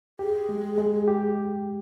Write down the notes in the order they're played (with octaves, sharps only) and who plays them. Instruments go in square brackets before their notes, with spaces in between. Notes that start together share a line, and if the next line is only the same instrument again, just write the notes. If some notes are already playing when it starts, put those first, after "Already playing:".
[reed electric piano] G4 [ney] G#4
[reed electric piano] G#3
G#3
G4